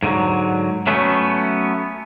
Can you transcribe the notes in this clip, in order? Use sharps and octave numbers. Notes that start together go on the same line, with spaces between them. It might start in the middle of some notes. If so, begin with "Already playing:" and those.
G#2 D3 F3 F#3
F#3 A3 B3 C#4